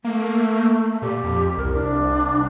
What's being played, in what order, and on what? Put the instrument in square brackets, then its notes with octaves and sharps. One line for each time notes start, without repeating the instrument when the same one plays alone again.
[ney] A3 [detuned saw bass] A#3
[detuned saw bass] A#2 [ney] G4
[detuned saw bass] F2
[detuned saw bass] C2 [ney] A#4
[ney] D4